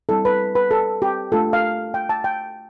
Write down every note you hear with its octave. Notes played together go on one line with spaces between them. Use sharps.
G3 C4 E4 A4
B4
B4
A4
G4
A3 D4 F4 A4
F5
G5
A5
G5